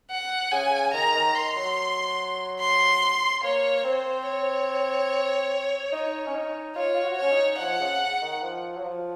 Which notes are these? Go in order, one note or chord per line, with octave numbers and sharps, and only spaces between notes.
F#5
C#3 G#5
D#3 A#5
D#3
C6
F#3
C6
A#3 C#5
C4 C5
C#5
D#4
C#4
D#4
F4 C#5
F4
F#4
C#4 C#5
D#4
F3 F#5
C#3
D#3
F3
F#3
F3